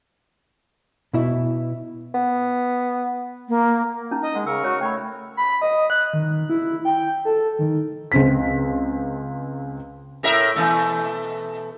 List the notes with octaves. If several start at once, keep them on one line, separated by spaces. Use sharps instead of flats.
B2 E4 E5
B3
A#3
C#4 D#4 A#5
D#5
G#3 F#5
C#3 A#4 C#6 E6
F#4 C#5
A3 C#5 G5 B5
B5
D#5
F#6
D#3
E4
G5
A4
D#3
C#2 C4 B6
A2 A#4 E5
B2 E3 A3